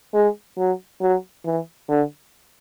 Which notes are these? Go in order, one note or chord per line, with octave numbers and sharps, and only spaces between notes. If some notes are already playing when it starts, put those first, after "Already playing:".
G#3
F#3
F#3
E3
D3